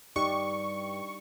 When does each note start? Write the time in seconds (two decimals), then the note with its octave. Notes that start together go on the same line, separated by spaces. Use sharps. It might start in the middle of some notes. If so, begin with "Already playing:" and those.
0.16 G2 D#4 G4 D5 C#6